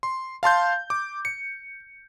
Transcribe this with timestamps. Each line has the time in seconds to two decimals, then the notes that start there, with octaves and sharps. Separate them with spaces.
0.03 C6
0.43 F5 A5 C6 G6
0.90 D6
1.25 C#7